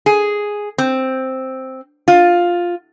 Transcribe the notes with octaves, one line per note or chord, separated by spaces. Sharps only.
G#4
C4
F4